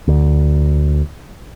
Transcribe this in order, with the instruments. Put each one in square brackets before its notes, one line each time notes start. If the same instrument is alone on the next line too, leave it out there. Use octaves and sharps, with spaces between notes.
[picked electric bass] D2